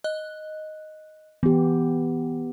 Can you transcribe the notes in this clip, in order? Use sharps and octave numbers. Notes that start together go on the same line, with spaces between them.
D#5 F#6
E3 B3 G4